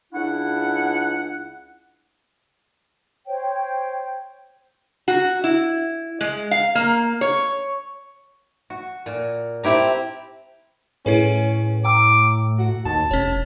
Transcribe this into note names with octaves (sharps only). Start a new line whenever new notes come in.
C#2 D4 E4 F#5
C5 C#5 G5
F#4
E4
G#3
F5
A#3
C#5
F#4
A#2
C4 E4 G4 A#5
A2 C#4 E4 G#4 B4
G5 A#5 D6 E6
F#4
D#2 A5
F1 C#4 C#5